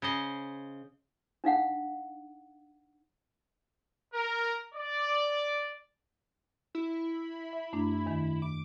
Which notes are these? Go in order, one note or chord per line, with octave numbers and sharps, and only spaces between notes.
C#3 C5 D#5
D4 D#4 F5 F#5
A#4
D5
E4
E5
F#2 A3 D4
E2 D#3
D6